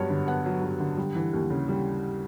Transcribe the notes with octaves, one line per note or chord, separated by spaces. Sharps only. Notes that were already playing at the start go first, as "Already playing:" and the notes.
Already playing: G2 F#3 B3 C#5
D3
B3 F#5
F#3
G2
D3
G3
E3
D#2
C#3
G3